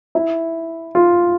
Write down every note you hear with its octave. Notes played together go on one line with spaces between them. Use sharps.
E4
F4